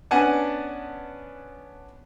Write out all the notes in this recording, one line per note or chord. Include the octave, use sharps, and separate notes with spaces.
B3 C#4 D4 F#5 G#5 A5